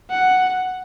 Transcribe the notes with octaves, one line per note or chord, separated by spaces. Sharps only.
F#5